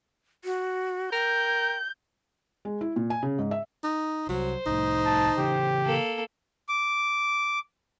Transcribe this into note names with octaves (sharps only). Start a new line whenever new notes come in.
F#4
A#4 G5 G6
G#3
E4
A#2
G#5
C#3
G#2
E5
D#4
C2 F#3 C5
C2 A2 D#4
A5
C#3 E3 G4
A#3 A4
D6